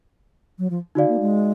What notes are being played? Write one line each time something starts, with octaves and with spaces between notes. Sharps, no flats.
F#3
F3
D3 D#4 F#4 D5 F5
A#3
G#3